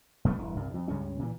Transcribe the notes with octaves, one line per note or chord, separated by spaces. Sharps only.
F2 B2 A3 B3
E1 G2 E3
C2 G2
F2
C#2 G2 C#3 C#4
A#2 E3